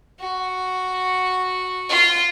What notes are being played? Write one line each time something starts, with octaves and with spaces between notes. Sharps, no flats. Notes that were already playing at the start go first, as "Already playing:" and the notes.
F#4
F4